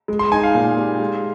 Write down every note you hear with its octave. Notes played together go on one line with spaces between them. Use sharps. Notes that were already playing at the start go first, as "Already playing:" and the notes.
G#3
C6
D#4 G#5
F5
A#2
G4
G#3